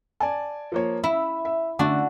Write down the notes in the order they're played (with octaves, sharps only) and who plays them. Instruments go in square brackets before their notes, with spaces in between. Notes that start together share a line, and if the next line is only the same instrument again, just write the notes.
[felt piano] D5 G#5 A5
F3 A#3 C#5
[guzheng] E4 [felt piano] E5
[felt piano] E5
[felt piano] D3 A3 [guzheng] D4 F#4